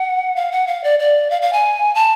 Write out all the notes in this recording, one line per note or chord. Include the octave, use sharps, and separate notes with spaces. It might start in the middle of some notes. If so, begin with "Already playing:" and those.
Already playing: F#5
F5
F#5
F5
D5
D5
F5
F5
G#5
A5